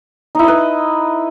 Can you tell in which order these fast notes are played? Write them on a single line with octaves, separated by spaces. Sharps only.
D#4 E4 D#5 B4